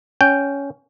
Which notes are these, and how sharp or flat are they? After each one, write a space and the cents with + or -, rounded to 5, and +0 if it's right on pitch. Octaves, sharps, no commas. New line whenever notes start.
C#4 +10 G5 +0